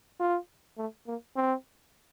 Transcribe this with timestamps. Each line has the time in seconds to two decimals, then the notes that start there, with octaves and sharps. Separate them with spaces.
0.20 F4
0.78 A3
1.07 A#3
1.36 C4